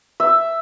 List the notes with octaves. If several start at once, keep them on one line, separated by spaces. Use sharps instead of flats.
E5